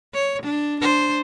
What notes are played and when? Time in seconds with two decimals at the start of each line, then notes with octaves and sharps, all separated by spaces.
0.13 C#5
0.43 D4
0.81 D4 C5